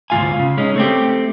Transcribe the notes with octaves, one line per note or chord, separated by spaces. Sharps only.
D2 G#2 F3 F4 F5 G#5
C#3
G#3 C#4 D#4
A3 C4 G4